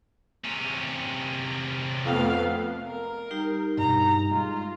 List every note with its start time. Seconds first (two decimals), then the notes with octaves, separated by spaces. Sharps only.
0.44 C3 C#4
2.05 F2 A3 B3 F5
2.87 A#4
3.31 G3 D#4 G4
3.78 G2 B2 A#5
4.31 G#3 F4